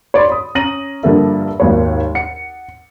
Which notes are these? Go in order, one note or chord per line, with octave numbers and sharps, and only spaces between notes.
C#5 D5 B5 C6
B5 D#6
C#4 A#5 A#6 D#7 F#7
G2 D3 F3 A#3 A4 E5
G#1 D#2 C#5
F#5 C#7